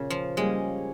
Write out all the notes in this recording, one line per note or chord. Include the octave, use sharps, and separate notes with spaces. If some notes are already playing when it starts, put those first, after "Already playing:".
Already playing: A#2 C#3
F3
G3 G#3 A#3 C#4 G#4 D#5